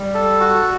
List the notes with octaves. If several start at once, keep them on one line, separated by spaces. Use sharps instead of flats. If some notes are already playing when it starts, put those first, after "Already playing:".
Already playing: G3
A4
F#4